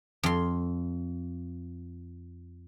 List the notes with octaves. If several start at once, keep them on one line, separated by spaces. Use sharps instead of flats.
F2 C6